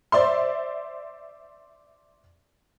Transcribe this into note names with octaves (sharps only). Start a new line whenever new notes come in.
C5 D5 E5 C6